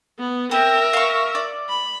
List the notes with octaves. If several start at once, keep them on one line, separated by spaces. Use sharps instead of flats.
B3
C4 A#4 E5
F5 C#6
D5
B5